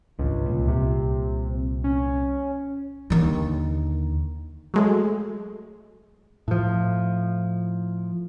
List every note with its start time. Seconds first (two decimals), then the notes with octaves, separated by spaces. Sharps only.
0.19 G#1 C#2 G2
0.45 C2 A#2
0.68 C3
1.84 C#4
3.10 D#2 D3
4.74 F#3 G#3 A3
6.48 A2 F3